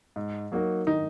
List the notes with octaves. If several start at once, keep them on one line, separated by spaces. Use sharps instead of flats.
G#2
F#3 A#3 D#4 F#4
D#3 D#4